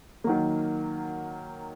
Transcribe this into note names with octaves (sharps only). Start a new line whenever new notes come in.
D#3 F#3 A#3